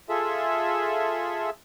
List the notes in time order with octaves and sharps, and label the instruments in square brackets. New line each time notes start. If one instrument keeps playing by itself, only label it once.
[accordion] F4 G#4 A4 E5